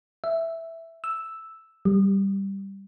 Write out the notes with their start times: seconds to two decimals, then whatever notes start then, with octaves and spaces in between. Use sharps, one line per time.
0.24 E5
1.04 E6
1.85 G3